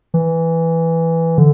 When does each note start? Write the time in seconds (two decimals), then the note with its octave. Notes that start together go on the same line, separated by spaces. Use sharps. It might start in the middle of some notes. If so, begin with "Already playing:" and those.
0.14 E3
1.38 D3